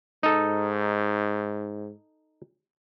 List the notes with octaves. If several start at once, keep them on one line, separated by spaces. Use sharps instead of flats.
G#2 D#4 A4